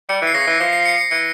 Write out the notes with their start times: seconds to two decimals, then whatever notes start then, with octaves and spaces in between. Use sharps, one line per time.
0.09 G3 C#7
0.22 E3
0.27 C7
0.34 C#3 A#6
0.47 E3
0.60 F3 C7
0.73 C7
0.86 C#7
0.98 C#7
1.11 E3 C#7